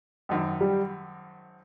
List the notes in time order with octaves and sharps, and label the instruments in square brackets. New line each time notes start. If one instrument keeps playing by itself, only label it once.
[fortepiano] G#1 F#2 D#3
[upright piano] G3